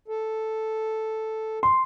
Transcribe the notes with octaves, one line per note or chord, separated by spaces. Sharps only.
A4
C6